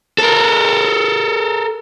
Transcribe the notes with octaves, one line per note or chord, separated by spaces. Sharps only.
A4 A#4